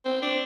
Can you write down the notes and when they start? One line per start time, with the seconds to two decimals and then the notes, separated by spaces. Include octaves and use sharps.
0.05 C4
0.22 D4